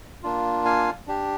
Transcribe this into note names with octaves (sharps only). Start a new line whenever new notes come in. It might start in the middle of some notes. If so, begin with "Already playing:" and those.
A#3 D4 F4
F5 G#5
D4 G4